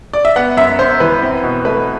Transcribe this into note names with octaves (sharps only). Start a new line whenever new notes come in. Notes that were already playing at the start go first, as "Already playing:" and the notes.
D5
E5
B3 F#5
F#2 E5
F#2 C5
E3 B4
C4
B2
A3 B4